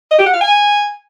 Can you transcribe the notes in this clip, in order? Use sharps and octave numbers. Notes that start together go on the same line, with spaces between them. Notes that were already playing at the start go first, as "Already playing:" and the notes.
D#5
G4
F#5
F5
G#5